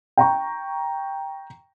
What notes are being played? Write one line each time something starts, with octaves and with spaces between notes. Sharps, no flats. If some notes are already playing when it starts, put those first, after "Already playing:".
G5 A#5 C#6